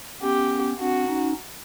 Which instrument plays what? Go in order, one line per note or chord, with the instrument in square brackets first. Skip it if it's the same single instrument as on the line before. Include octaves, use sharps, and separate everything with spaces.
[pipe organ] B3 C#4 [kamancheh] G4
[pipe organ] C4 D4 [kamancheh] F#4
[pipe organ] C#4 D#4